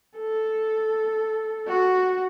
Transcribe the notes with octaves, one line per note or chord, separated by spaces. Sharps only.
A4
F#4